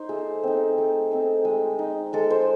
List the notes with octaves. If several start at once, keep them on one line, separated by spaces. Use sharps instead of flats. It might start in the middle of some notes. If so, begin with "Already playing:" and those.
Already playing: D#4 C5
A3 G#4
C4 D#4
A3
C4 D#4
G#3
D#4
G#3 A4
C5